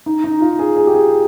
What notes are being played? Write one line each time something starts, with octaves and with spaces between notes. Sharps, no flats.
D#4
D#4
F4
G#4
G#4
G4
G#4